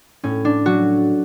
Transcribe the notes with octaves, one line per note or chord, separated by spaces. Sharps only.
A2 C#4
D4
F#3 F#4